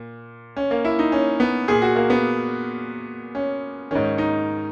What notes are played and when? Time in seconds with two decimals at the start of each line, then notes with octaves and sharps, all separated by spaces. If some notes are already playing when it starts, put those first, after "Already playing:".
Already playing: A#2
0.57 C#4
0.71 A#3
0.85 E4
0.99 D#4
1.12 C#4
1.40 B3
1.68 A#2 G#4
1.82 F#4
1.96 A#3
2.10 B3
3.35 C#4
3.91 G#2 D#3 C#4
4.18 D#4